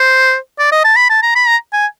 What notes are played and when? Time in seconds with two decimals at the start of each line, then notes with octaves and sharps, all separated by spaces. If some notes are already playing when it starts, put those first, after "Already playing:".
Already playing: C5
0.59 D5
0.72 D#5
0.85 A5
0.96 B5
1.10 A5
1.23 A#5
1.35 B5
1.48 A#5
1.73 G#5